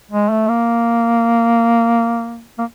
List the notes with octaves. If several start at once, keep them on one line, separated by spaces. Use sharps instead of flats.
G#3
A3
A#3
A#3